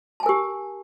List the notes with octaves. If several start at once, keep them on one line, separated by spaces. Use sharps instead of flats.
G4 A#4 G#5 A5